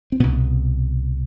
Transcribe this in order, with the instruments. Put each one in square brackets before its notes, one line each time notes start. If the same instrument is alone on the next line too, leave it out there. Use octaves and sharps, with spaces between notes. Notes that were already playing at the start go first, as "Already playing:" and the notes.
[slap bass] C4
C2 B2 B3